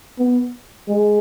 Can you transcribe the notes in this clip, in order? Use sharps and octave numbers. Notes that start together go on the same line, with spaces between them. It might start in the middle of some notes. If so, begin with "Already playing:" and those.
B3
G#3